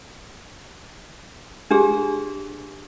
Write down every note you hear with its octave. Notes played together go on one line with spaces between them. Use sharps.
D4 G4 G#4